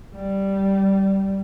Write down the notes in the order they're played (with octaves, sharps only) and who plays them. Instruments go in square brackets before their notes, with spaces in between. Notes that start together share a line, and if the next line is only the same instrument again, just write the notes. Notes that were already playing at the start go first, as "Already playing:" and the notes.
[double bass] G3